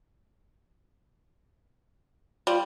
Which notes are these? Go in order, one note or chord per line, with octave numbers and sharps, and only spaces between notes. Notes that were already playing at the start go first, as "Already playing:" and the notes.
G3 F4